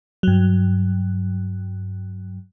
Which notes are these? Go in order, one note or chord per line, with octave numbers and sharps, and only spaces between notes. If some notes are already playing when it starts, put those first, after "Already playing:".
G2 F#3